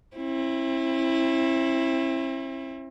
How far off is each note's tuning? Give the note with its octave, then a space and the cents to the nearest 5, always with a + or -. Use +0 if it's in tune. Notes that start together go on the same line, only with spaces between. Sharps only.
C4 +45 E4 +5